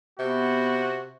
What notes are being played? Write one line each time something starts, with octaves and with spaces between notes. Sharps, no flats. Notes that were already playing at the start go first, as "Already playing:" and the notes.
C3 B3 F#4